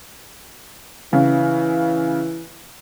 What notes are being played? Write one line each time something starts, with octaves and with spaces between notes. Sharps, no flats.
C#3 E3